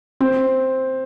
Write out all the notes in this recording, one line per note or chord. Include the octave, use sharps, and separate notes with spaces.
C4